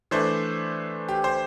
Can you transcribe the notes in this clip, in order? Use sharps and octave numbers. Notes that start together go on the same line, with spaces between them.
E3 A3 D4 C5
G4
C5